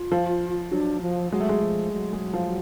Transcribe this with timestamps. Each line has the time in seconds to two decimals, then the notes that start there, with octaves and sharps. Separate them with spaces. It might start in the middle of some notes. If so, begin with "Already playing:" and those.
Already playing: F4
0.12 F3
0.71 F#3 D4
1.01 F3
1.32 F#3 G#3
1.40 A3
1.49 G#3
1.62 F3
1.93 F#3
2.13 G#3
2.34 F3